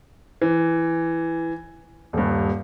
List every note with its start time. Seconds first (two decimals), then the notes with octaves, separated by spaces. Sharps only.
0.42 E3
2.13 D#1 G2